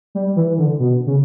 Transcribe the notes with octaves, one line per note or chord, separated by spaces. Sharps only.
G3
E3
D3
B2
C#3